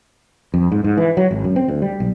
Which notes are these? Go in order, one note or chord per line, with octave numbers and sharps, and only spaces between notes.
F2
G#2
G#2
E3
F#3
G#1
F#2
C4
D2
G3
B1